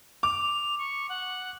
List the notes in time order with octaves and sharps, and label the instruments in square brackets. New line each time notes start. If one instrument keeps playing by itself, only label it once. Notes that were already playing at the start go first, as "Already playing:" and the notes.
[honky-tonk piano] D6 [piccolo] F7
[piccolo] C#6
F#5